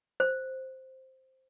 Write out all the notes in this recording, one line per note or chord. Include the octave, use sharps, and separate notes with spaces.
C5